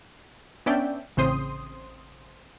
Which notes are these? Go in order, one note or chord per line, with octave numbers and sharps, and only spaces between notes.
B3 C#4 D4 D5 E5 G5
A1 C#3 C4 C5 C6 D#6